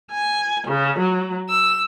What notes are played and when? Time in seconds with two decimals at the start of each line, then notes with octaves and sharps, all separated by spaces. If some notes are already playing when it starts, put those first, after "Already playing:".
0.11 G#5
0.67 C#3
1.00 F#3
1.50 E6